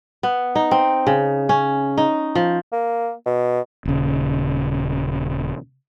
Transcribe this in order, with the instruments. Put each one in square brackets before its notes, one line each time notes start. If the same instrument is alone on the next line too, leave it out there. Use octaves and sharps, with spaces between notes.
[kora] B3
D#4
C4
C#3
C#4
D#4
F3
[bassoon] A#3
B2
[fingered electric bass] D#1 C#3